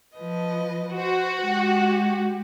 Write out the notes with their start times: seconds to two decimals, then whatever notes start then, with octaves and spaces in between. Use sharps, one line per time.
0.17 F3 B4 D#5
0.93 F#4 C5
1.39 G#3 G4